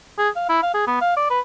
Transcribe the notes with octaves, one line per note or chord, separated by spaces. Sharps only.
G#4
F5
E4
F5
G#4
B3
F5
D5
B4